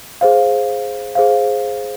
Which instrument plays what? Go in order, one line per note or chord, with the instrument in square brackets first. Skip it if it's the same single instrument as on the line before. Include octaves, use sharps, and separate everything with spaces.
[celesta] G#4 C5 F5
G#4 C5 F5